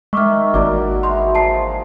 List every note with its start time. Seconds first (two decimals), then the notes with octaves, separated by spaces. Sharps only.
0.13 D#3 G#3 E5 C#6 D6 F6
0.54 G#1 A#3 D4 F#4 A#4 D5 D6
1.03 E3 G#3 D#4 C6
1.35 F3 G#3 D5 A5 C7